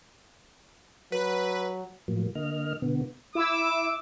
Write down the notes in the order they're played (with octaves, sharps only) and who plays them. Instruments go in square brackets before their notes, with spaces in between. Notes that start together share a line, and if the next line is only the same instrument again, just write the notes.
[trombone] F#3 [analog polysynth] B4
[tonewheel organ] A2 F3 F#3 A#3
D3 A#3 D#5 F6
B2 D3 B3
[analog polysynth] E4 E6 [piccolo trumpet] D6